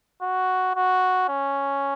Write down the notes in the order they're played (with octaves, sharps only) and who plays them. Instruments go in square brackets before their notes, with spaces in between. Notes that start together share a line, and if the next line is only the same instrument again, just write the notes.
[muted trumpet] F#4
F#4
C#4